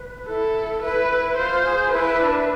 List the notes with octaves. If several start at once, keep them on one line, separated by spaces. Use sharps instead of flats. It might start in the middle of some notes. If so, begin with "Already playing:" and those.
Already playing: B4
E4 A4
E4 B4
E4
F4 C5
G#4
E4 B4
D4